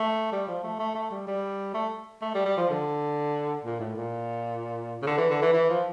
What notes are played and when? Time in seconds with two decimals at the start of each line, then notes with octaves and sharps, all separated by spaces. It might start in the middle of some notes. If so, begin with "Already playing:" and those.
Already playing: A3
0.32 G3
0.48 F3
0.63 A3
0.79 A3
0.95 A3
1.11 G3
1.27 G3
1.74 A3
2.22 A3
2.34 G3
2.46 G3
2.57 F3
2.70 D3
3.65 A#2
3.80 A2
3.96 A#2
5.02 C#3
5.07 D3
5.18 E3
5.30 D3
5.42 E3
5.53 E3
5.70 F3